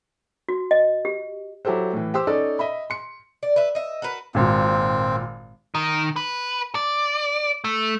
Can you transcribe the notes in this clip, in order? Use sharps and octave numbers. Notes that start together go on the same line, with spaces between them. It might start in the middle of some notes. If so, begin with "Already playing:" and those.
F#4
D#5
G4
F#3 E4 G4 A4 C5
A2 E3
G4 C5 C6 E6
C#4 D#4 A4 D5
D#5 E5 B5
C6 C#7
D5
B4 E5
D#5 E5
F#4 A#4 B4
G#1 A#2 C4
D#3
B4
D5
A3